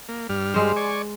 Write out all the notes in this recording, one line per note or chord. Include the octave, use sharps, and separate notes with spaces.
A#3
G2 G3 F6
G#3 C5
D5 G#5 C#6